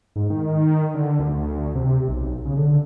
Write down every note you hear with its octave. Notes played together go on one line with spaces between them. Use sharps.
G#2
D#3
D3
D2
C3
B1
C#3
D3